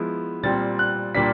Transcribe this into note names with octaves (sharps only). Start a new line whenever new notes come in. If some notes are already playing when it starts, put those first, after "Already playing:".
Already playing: F3 G#3 B3 E4
A#2 G3 C4 A6
F#6
A#2 G3 A#3 D4 B6